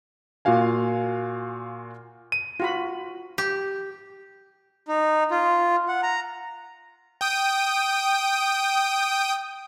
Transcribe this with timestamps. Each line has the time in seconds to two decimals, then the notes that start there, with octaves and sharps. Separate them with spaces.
0.45 A#2 F4 F#4 F5 G#5
2.32 D#7
2.60 F4 F#4 B5
3.38 G4
4.88 D#4
5.31 F4
5.88 F#5
6.03 A#5
7.21 G5 D#6